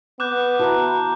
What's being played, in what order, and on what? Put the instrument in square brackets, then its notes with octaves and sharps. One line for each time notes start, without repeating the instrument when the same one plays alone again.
[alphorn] B3 [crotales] D6 F#6 G6
[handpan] E4 F#4 B4 [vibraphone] A5 A#5